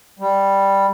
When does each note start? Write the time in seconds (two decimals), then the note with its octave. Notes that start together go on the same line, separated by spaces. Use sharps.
0.19 G3